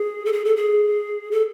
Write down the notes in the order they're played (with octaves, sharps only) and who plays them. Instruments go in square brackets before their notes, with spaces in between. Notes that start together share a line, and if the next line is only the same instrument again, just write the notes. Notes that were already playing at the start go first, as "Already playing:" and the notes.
Already playing: [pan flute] G#4
A4
G#4
A4
G#4
A4